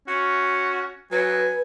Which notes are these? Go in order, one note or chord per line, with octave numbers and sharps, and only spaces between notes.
C#4 F#4
F#3 B4 G#5